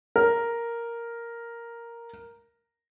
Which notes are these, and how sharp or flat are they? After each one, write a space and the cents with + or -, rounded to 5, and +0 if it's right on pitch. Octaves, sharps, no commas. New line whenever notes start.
A#4 +0